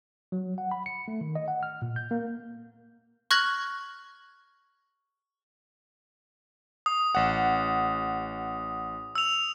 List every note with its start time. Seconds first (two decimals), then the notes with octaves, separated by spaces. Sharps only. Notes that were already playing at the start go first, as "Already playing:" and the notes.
0.32 F#3
0.58 F#5
0.71 B5
0.86 C#7
1.08 A3
1.21 D#3
1.35 D#5
1.48 F#5
1.63 F6
1.82 A#2
1.96 G6
2.11 A#3
3.31 C#6 F6 F#6 G#6 A#6 F#7
6.86 D#6
7.15 A1 F#5
9.15 E6 F7